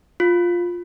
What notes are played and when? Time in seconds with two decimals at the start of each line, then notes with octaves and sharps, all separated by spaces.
0.20 F4